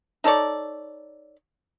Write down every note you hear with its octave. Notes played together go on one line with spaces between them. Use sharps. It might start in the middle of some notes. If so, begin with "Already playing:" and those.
D#4 A4 C#5 D5